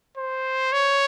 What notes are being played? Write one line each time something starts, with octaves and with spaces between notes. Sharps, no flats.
C5
C#5